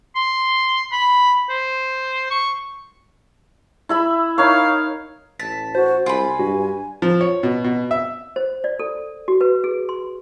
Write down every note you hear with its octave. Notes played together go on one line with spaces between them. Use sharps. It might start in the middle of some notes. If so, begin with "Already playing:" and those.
C6
B5
C5
C#6
E4 E5 B5
D#4 A#4 C#5 F5
A1 A5 B6
F#4 C5
C2 F4 G#5 B5
G2 F#4
F3
C#5
B2
B2
E5
C5
D5
A4
F#4
B4
G#4
C6